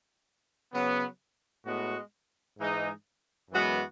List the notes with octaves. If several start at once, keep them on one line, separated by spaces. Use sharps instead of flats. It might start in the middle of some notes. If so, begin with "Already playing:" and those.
C#3 F#3 B3
A2 G#3 B3 F#4
G#2 E3 G#3 D#4
F#2 E3 G#3 B3 F#4